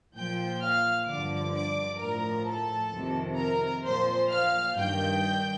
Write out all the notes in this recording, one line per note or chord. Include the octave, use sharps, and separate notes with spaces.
A#2 F3 G5 G6
F5 F6
G2 D3 F3 D5 D6
D5 D6
A2 F3 A#4 A#5
A4 A5
F2 C3 D#3
A#4 A#5
A#2 F3 C5 C6
F5 F6
G2 D#3 G5 G6